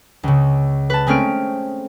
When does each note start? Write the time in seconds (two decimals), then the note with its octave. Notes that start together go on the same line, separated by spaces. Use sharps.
0.23 C#2 C#3
0.90 B4 A5
1.07 G#3 A3 C4 C#4 F6 D7